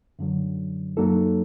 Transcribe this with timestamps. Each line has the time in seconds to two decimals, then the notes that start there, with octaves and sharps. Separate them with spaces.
0.19 F#2 D3 F#3
0.97 F#2 F#3 A#3 D#4 A4